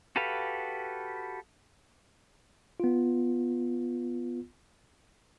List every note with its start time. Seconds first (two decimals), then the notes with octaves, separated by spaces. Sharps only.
0.16 F#4 G4 A4 B4 F5
2.80 B3 F4